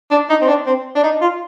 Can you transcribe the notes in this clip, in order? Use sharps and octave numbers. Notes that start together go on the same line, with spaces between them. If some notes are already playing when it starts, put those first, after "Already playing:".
D4
D#4
C4
D4
C4
D4
D#4
F4